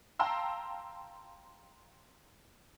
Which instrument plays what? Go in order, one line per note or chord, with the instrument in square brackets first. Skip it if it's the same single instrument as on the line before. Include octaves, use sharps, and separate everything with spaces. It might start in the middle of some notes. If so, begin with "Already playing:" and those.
[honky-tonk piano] F5 G5 A5 A#5 C6 E6